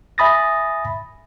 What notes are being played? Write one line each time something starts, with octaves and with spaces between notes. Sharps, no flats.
E5 G#5 B5 D#6 A6 A#6